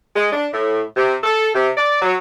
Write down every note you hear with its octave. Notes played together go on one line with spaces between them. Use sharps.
G#3
D4
A2
C3
A4
C3
D5
F#3